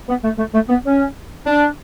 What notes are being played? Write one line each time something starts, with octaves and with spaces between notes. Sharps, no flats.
B3
A3
A3
A3
B3
C#4
D4